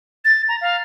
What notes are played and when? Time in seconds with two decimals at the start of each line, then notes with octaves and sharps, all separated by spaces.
0.25 A6
0.48 A#5
0.61 F5